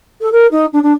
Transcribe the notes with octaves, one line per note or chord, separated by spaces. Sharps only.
A4
A#4
D#4
D4
D4